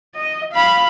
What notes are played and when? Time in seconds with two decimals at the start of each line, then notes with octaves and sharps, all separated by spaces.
0.16 D#5
0.52 F5 B5